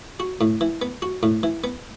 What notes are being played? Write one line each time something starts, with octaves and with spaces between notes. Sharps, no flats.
F#4
A2
E3
B3
F#4
A2
E3
B3